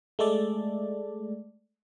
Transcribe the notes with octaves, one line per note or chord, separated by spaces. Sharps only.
G#3 A3 A4 D5